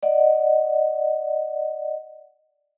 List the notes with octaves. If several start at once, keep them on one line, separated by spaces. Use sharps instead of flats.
D5 D#5 F#5